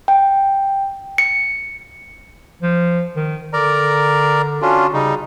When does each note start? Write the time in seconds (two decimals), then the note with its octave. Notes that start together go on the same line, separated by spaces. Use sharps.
0.08 G5
1.18 C#7
2.62 F3
3.16 D#3
3.53 D3 A#4 D5 A#5
4.62 C#4 D4 F4 F#4
4.93 C#3 G3 D#4